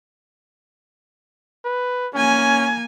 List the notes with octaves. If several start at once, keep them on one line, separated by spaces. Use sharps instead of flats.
B4
A#3 C#4 G#5